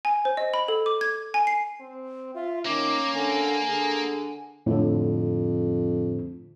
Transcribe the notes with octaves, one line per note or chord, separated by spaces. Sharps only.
G#5
C5
D#5
B5
A4
D6
G#6
G#5
C7
C4
F4 E5
D#3 A#3 C#4 D6
D3 G#5
D3 G#4
F2 A2 D3